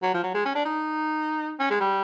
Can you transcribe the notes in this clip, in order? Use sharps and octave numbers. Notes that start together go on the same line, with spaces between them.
F#3
F3
F#3
G#3
C#4
D4
D#4
C#4
G#3
G3